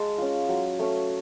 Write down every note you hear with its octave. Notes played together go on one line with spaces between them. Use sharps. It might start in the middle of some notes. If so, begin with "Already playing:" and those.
Already playing: G#3 A5
C#4 F4
F#3
A3 C#4